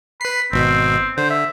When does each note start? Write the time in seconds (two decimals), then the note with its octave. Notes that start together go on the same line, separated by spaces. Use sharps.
0.21 B4 B5 C7
0.52 G#1 B2 C4
1.17 D3 C5
1.30 E5